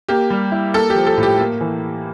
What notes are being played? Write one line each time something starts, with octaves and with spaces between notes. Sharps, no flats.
A#3 G4
G3
E4
A#3 A4
G4
F3
A4
A2
G4
A#3
E3